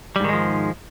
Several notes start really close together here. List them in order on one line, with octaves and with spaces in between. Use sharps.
G3 G#2 D#3 G#3 F3